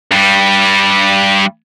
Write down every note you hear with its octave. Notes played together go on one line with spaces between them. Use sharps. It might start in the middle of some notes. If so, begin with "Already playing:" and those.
G2 G3